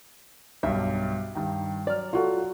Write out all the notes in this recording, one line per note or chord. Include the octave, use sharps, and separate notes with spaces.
B1 G2 E5
G2 D#3
F#3 D5 F6
F4 F#4 A4